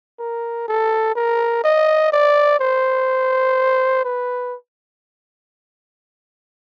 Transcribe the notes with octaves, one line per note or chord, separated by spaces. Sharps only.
A#4
A4
A#4
D#5
D5
C5
B4